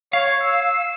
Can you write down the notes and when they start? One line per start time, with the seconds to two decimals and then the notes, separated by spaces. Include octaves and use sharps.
0.13 C#5 F5
0.42 E6